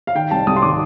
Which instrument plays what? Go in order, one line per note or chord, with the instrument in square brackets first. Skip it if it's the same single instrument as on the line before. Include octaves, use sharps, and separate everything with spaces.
[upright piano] F5
D#3 G5
C2 A5
C2 D#6
C6
D#3 D6